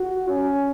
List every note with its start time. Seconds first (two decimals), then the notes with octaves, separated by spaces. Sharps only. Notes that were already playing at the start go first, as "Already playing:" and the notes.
Already playing: F#4
0.28 C#4